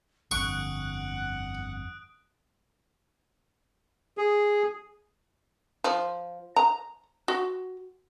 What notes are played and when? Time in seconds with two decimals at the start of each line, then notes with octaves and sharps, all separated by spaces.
0.31 G1 F2 D3 F#5 C#6 D#6 F#6 D7
4.18 G#4
5.84 F3
6.56 A#5
7.28 F#4